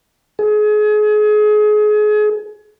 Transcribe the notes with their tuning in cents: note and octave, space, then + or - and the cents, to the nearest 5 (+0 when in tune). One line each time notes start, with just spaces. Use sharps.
G#4 +30